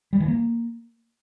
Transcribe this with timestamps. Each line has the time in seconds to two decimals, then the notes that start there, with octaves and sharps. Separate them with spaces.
0.13 G3
0.20 E3
0.28 A#3